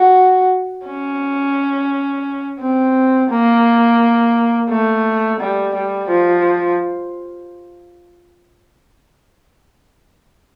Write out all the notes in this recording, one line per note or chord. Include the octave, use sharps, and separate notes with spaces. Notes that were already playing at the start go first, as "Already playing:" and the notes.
Already playing: F#4
C#4
C4
A#3
A3
G3
G3
F3